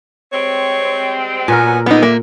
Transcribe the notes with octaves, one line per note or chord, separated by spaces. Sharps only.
G3 G#3 C4 C#5
A#2 F#3 B3 A#4 G#5
D3 B3 D#4 B4
A#3 E5